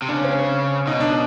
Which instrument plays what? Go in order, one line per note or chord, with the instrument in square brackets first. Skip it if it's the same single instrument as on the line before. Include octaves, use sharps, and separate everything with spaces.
[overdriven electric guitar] C3
[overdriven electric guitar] C#3 [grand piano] D4
[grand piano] C#4
C4
C#4
[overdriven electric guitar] B2 [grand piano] D#4
[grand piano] D4